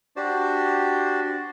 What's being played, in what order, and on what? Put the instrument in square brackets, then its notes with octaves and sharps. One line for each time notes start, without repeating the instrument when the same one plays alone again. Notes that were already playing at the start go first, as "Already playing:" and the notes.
[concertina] D4 F#4 G4 C5 D5